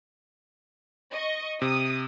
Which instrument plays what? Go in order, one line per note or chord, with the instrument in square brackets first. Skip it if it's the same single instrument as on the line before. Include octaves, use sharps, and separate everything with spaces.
[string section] D#5 C#6
[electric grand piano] C3 [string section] D#6